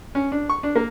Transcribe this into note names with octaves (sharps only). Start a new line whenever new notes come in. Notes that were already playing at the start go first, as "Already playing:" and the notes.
C#4
D4
C#6
D4
A#3